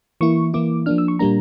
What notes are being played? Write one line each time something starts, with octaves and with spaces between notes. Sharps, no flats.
E3 A#3 E4 C#6
E3 A#3 E4 D6
F3 A#3 D4 F6
E6
C#6
A#2 G3 A#3 D4 A#5